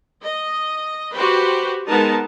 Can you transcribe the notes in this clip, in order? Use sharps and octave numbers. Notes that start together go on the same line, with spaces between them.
D#5
F#4 G4 B4 C5
G#3 B3 D#4 A#4 A5